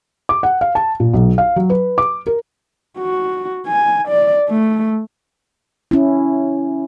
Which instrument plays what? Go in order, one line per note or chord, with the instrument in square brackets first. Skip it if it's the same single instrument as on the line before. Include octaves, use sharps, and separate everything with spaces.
[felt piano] D6
F#5
F5
A5
A#2
B1
F5
F#3
B4
D6
A#4
[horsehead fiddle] F#4
G#5
D5
A3
[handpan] C#4 E4